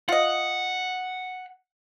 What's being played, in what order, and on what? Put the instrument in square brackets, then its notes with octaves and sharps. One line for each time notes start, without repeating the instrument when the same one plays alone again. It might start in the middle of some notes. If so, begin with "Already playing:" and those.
[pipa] F4 D#5 [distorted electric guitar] F#5